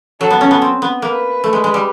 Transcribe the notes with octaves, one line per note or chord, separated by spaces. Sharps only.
F#3 A4
B3
C#4
B3
C4
B3
A#3 B4
A3
G#3
G#3
G3